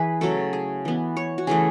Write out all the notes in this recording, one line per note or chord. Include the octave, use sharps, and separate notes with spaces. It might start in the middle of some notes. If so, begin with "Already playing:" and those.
Already playing: E3 E4 G#4 B4
C#3 F#3 A3 A4
G#4
E3 B3
C#5
F#4
C#3 E3 A3 G#4